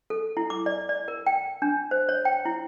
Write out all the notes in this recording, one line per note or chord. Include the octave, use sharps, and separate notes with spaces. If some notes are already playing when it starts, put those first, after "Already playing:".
A4
E4
D6
D5
D5
A#4
G5
D4
C5
C#5
G5
E4